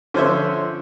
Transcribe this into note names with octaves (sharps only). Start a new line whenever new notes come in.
D3 F3 C#4 C5 C#5 E5